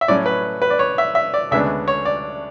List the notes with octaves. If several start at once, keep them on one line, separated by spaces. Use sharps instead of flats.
E5
A2 F#3 C#4 D5
B4
B4
D5
C#5
E5
E5
D5
D2 C#3 G#3 B3 D4 E5
C#5
D5